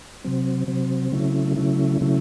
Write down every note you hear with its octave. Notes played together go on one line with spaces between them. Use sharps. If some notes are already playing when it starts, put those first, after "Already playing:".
C3 F#3 C4
C3 F#3 C4
C#3 F#3 A3 C#4 E4
C#3 F#3 A3 C#4 E4
C#3 F#3 A3 C#4 E4